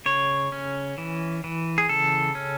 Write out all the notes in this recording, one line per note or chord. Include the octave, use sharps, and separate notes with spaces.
C#3 C#5
C#4
E3
E3
G#4
C#3 A4
C#4